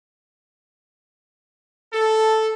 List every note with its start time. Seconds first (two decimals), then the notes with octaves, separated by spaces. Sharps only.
1.93 A4